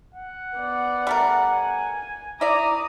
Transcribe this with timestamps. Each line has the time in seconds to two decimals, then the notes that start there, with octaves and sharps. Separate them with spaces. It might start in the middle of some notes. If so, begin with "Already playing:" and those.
0.14 F#5
0.58 B3 D5
1.07 G3 A3 A#4
1.56 G#5
2.41 E4 D5 A#5 D6 D#6